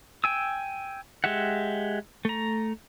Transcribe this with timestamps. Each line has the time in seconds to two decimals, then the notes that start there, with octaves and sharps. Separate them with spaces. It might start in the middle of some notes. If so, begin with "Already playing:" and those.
0.24 G5 G#5 E6
1.24 G#3 G4 E5 F#5
2.25 A3 A#5